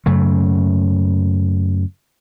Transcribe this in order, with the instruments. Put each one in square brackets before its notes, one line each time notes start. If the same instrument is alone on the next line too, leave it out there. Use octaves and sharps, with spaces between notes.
[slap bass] F#2 C#3 A3